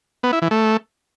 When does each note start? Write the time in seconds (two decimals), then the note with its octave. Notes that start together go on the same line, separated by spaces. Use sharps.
0.23 B3
0.33 E4
0.42 E3
0.51 A3